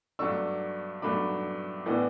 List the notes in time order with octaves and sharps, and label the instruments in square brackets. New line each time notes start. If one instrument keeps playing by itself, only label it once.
[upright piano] G2 F#3 A3 D4 C#6 E6
G2 F#3 A3 D4 B5 D6
A2 E3 B3 D4